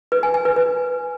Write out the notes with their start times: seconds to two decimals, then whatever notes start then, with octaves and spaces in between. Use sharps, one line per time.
0.12 B4
0.23 G#5
0.34 G#5
0.45 B4
0.56 B4